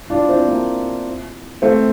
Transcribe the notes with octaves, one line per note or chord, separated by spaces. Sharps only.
D4 F4
C4 E4
A#3 D4
A3 C4